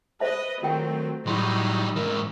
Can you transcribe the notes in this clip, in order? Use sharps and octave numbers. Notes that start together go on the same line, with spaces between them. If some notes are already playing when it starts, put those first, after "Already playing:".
B4 C5 D#5 E5 A5
D#3 F#3 A3 C4 F4 G5
A2 F#3 G3 D#4 B5 C6
G#2 E3 A#4